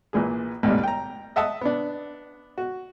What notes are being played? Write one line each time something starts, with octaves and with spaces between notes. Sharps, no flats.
A#1 A#2 E3 G#4
A1 D2 G#2 B2 G3
G5 A#5
D#5 E5 F#5 A5 D#6
B3 D4
F#4